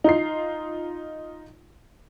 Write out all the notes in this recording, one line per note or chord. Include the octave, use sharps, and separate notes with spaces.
D#4 F4 C7